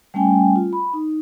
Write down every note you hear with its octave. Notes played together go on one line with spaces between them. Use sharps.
G3 A3 C#4 G5 G#5
F4
B5
D#4